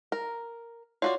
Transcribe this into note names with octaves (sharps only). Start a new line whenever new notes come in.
A#4
F4 F#4 C#5 D5